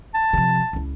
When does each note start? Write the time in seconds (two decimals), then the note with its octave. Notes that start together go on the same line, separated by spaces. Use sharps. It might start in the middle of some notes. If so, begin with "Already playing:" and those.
0.14 A5
0.33 C3 F3
0.73 C#2 E4